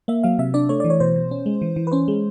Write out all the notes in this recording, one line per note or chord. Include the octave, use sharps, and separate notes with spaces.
A#3 E5
F#3 F5
C3 E5
D4 D5
A3 C#5
E3 D5
C#5
B2 C5
B2
C#4
G#3
E3
E3
B4
C#4 C5
G#3